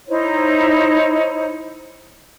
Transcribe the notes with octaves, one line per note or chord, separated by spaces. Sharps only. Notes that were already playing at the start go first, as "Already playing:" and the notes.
D#4 E4 C5 C#5